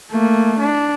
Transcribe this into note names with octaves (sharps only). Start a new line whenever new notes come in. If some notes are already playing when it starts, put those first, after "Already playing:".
A3 A#3
D4